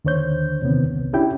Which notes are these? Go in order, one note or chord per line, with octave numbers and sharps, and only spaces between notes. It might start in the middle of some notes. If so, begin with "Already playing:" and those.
D#2 D3 C5 C#5 G6
C3 D#3 B3 C4
C2
C#4 D4 E4 G4 G5